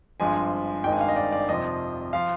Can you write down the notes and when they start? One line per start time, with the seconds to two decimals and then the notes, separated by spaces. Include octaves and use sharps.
0.20 G#1 G2 F3 G#3 G#5
0.84 G#1 G2 D#3 G#3 D#4 G5
0.92 G#5
1.01 F5
1.08 D#5
1.16 D5
1.32 D5
1.48 F2 C3 F3 D#5
2.13 F3 F5